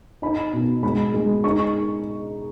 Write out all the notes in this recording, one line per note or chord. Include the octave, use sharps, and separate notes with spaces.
D#4 B5
B2
G#3 B5
G#3
D#4 C#6